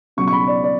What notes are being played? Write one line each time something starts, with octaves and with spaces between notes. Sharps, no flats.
C#2 B2 F#3 C#6
C#6
B5
D5
D5